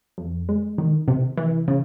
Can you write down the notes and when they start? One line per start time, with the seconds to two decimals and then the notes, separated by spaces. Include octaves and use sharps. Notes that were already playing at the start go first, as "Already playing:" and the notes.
0.18 F2
0.49 G#3
0.78 D#3
1.08 C3
1.37 E3
1.68 C#3